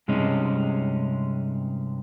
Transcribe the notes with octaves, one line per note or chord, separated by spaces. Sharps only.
G2 C3 G#3 C#4 D#4